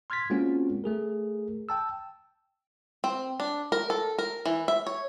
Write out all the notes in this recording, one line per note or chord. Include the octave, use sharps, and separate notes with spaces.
C6 F6 G#6 A6 B6
G#3 A#3 C4 C#4 F4 F#4
A3 G#4 A#4
G5 A5 E6
C4
D4
A#4
A4
A#4
E3
E5
C#5